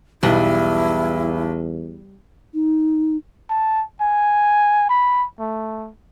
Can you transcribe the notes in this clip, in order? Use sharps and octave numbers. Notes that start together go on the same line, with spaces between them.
B1 E2 G3 E4 B4 D#5
D#4
A5
G#5
B5
A3